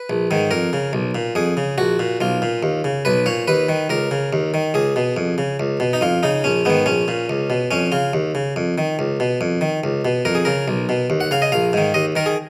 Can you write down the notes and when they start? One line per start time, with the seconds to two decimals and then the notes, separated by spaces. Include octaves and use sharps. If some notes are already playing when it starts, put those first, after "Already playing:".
Already playing: B4
0.10 A#1
0.31 G#2 D#3
0.51 F2 A#4
0.73 C#3
0.93 B1
1.15 A#2
1.35 F2 G#4
1.57 C#3
1.78 A#1 F#4
1.99 A#2
2.21 B1 F4
2.42 A#2
2.63 D#2
2.84 C#3
3.05 B1 B4
3.26 A#2 C#5
3.48 D#2 B4
3.69 D#3
3.90 C#2 A#4
4.11 C#3
4.33 D#2
4.54 D#3
4.74 C#2 G#4
4.96 B2
5.17 F2
5.38 C#3
5.60 C#2
5.80 B2
5.93 D#4
6.01 F2 F4
6.23 C#3 D#4
6.44 A#1 C#4
6.65 G#2 D#3 B3
6.86 A#1 C#4
7.08 A#2
7.30 C#2
7.50 B2
7.71 F2 C#4
7.92 C#3 F4
8.13 D#2
8.35 C#3
8.56 F2
8.78 D#3
8.99 C#2
9.20 B2
9.41 F2
9.61 D#3
9.84 C#2
10.05 B2
10.25 F2 A#4
10.35 G#4
10.45 C#3 A#4
10.68 B1
10.89 B2
11.10 D#2
11.21 F#5
11.31 C#3 F5
11.42 D#5
11.52 A#1 F5
11.73 G#2 D#3
11.94 D#2 D#5
12.16 D#3 A#4
12.26 G#4